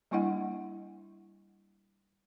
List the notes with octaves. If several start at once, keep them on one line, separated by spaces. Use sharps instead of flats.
G3 A#3 D4 E4 D#5 F#5